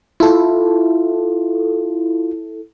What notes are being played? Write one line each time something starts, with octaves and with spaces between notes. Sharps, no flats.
E4 F4 A4